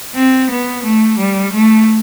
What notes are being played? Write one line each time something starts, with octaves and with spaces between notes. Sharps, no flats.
C4
B3
A3
G3
A3